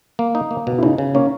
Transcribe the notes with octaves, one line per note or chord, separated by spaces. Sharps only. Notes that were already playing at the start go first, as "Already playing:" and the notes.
A#3
D#4
A#3
B2
E4
C#3 D#4
C#3
A#3 C#4